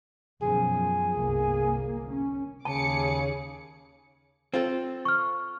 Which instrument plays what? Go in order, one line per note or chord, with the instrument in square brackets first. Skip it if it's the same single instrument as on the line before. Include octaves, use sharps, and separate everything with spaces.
[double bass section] F#2 B2 F3 [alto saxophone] G#4
[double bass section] G1 C2 A#3
C#4
[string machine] D#2 G#4 [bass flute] C#3 [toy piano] A5 [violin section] D6 C#7
[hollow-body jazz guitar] C4 F4 A4
[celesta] C#6 F6